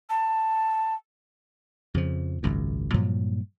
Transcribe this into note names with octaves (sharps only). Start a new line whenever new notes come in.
A5
F2 C#3 F3
G#1 C#2 F#2
G2 A#2 F3 F#3